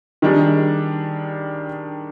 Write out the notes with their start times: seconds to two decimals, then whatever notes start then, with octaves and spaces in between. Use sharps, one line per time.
0.22 D#3 G3 D4 G#4